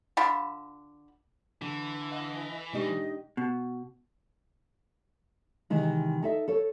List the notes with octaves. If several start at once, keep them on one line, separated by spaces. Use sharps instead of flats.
D3 F4 B5
D3 E3
D#5 F5 F#5 E6
B2 G#3 D4 D#4 G4 D#5 C#6
B2
C3 D#3 E3 G#3
D#4 A4 E5
A4 C#5